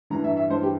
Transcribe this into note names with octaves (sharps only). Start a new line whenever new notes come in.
G2 E3 A#5
E5
E5
G2 E3 C5
G4